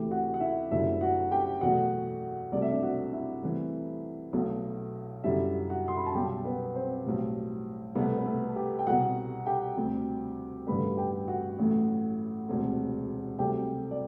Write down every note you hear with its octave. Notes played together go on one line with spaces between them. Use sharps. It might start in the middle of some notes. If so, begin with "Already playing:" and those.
Already playing: D2 C3 E3 A3 G4
F#4 F#5
F#5
E4 E5
F#1 F#2 D3 G3 E4 E5
F#4 F#5
G4 G5
E2 B2 F#3 A3 F#4 F#5
C2 C3 F#3 A3 D5
E5
D4 D5
F#4 F#5
E4 E5
C2 C3 E3 A3
B1 B2 F#3 A3
F#2 D3 G3 E4 E5
F#4 F#5
C6
B5
A5
B1 B2 G3 G4 G5
B3 B4
C4 C5
B1 A2 G3
C2 B2 A3 B3 B4
B4
A3 A4
A4
G4
G5
C2 B2 G3 F#4 F#5
G4 G5
D2 C3 G3
A1 G2 D3 G3 B4 B5
G4 G5
F#4 F#5
A1 A2 F#3 A3
E1 D2 C3
C2 C3 F#3 A3 G4 G5
D5